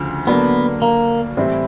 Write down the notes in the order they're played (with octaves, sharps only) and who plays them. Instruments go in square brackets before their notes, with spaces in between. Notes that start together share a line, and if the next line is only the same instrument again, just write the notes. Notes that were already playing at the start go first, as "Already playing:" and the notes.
Already playing: [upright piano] D2 C#3 F3
[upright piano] D3 F#3 A#3 D4 [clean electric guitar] B3
[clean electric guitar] A#3
[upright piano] A2 E3 G3 C4 E4